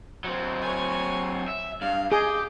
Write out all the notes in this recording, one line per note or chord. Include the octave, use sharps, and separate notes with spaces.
F#3 C4
C#5 G#5
E5
G2 F5
G4 G#4 D#5